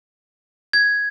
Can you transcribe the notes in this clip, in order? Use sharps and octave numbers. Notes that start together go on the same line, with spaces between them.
G#6